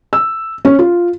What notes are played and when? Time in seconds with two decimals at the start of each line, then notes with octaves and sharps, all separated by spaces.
0.13 E6
0.65 C#4
0.79 F4